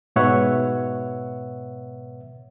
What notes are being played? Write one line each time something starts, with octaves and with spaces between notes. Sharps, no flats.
G#2 B2 B4 C#5 E5 F#5